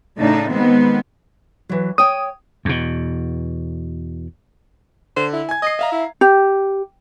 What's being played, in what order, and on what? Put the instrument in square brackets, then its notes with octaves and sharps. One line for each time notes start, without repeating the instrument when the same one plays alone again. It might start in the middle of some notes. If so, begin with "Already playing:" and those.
[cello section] A2 C#3 D4 D#4
D#3 G#3 B3 C4
[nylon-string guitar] E3 F#3
[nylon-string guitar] C#5 G5 [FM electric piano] D#6
[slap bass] E2 B2
[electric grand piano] D3 [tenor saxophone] C5
[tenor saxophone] E4
[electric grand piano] G#5 G#6
[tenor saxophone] D#5 [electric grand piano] D#6 C7
[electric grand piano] E5 F5 A#5
[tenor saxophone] E4
[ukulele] G4